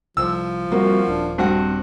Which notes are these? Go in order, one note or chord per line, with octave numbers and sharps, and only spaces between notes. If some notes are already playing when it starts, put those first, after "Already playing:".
C2 F3 E6
G3 A#3 C4 F#4
D#1 D4
G2 C4 F#4 F#5